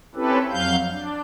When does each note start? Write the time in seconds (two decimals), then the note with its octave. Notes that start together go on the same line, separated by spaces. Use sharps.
0.15 C4 C#4 E4 G4 A4 B4
0.51 F2 F#3 F5 G6
0.90 D4